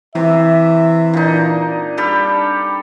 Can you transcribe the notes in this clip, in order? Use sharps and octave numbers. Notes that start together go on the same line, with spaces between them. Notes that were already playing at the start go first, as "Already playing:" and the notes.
C3 E3 E5
A#2 D4 D#4
G3 G4 A4